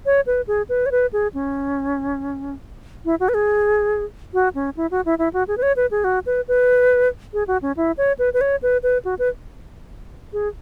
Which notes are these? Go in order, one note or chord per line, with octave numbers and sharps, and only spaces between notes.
C#5
B4
G#4
B4
C#5
B4
G#4
C#4
E4
F#4
B4
G#4
F#4
C#4
E4
F#4
E4
E4
F#4
G#4
B4
C#5
B4
G#4
F#4
B4
B4
G#4
F#4
C#4
E4
C#5
B4
B4
C#5
B4
B4
F#4
B4
G#4